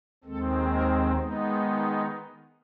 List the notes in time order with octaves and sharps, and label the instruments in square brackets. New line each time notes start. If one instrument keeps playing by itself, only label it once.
[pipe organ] D#2 D#3 G#3 C4 A4
A#4
D#3 G#3 B3 D#4